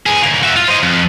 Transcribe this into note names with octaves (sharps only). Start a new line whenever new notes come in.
G2 G#4
D2 A#3
F#4 E5
F4
C5 D#5
F2